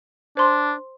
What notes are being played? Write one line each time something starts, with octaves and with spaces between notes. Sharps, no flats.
D4 C5 C6